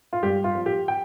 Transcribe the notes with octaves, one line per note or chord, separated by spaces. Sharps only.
F4
G2 G4
F4
F3
G4
G5